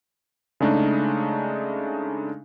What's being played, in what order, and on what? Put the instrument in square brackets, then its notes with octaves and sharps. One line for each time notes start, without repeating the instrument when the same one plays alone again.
[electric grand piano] C#3 G#3 A3 D4 D#4